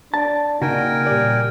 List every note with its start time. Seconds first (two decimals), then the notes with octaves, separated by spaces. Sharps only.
0.14 D4 D5 A5
0.62 C#3 A#3 D#4 F#4 A#4 G5 G#5
1.07 A#2 G3 D5